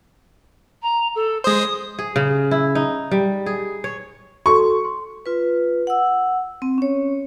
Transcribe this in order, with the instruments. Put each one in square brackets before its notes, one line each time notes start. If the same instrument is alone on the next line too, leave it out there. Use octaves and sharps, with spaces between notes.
[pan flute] A#5
A4
[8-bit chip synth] G#3 C5 [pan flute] D#6
[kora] G#4
C#3
E4
D#4
G3
G#4
C#5
[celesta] F#4 A4 C6 [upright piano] C#6
[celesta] C6
[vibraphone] F4 B4
F#5 E6
C4
C#4 C#5